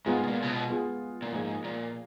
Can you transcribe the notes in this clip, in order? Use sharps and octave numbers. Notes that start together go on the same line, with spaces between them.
G#2 G#3 B3 F4 G#4
B2
A#2
C#3
B2
G#3 B3 F4 G#4
A#2
G#2 F3 A#3 F4 G#4
A#2